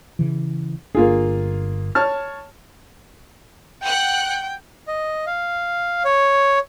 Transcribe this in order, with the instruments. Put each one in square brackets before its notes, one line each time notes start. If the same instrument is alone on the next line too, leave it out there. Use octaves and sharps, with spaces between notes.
[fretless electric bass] C#3 E3
[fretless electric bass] G1 D4 [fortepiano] A#3 F4 G#4
[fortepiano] C#5 A5 F6
[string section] F#5 F#6 [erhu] G5
[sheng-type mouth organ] D#5
F5
C#5